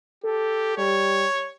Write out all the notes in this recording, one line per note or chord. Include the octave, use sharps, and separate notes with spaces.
G4 A4
G3 C#5